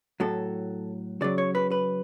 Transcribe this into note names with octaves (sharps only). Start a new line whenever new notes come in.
A2 F#3 A4
C#3 F#3 D5
C#5
B4
B4